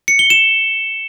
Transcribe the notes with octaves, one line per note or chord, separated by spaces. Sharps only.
C#7
G7
E7